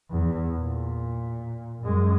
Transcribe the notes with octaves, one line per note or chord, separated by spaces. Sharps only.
E2
A#2
F#2 G#3